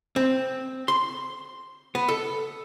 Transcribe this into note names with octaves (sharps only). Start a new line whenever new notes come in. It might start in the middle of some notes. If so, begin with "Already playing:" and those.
C4
C6
B3
A4